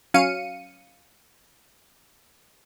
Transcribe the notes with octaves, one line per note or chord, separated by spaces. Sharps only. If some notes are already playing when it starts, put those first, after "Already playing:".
F#3 C#4 F5 C#7 D#7